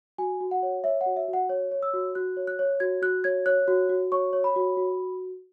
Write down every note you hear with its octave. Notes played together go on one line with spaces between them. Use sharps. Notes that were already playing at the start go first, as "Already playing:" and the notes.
F#4 G#5
F#4
F#5
C#5
C#5 E5
F#5
F#4
E5
F#4
F#5
C#5
C#5
E6
F#4
F#4 F#6
C#5
F#6
C#5
F#4 G#6
F#4 F#6
C#5 G#6
C#5 F#6
F#4
F#4
C#5 C#6
C#5
B5
F#4
F#4